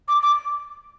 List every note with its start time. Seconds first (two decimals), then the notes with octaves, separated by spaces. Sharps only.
0.08 D6
0.23 D6